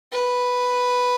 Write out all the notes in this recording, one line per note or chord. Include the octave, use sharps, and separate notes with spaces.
B4